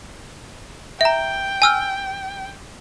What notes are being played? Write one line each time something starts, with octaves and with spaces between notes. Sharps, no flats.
E5 G5 A#5
G#5 E6 F6